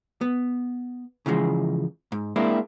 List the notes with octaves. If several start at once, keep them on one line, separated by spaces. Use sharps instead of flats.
B3
C#3 E3 F3 G#3
G#2
G#3 A#3 C4 D4 E4